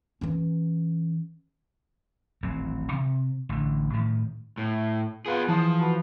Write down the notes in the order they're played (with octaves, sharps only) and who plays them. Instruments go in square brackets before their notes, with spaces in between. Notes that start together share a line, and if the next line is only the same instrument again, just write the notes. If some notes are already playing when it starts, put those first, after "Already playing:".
[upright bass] E3 C#4
[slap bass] D#1 A1 F#3 C4
C3
A1 D3
A2 D#3
[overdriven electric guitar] A2
[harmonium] B3 F4 [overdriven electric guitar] G#4 B4
[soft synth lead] E3 [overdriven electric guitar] F3 [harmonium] G#4 A5
[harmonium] F#4 B4